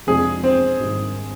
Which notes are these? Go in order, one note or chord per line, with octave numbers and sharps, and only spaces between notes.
F2 C3 F3 G#3 D4 G#4
C4
G#1 G2 D#3 G3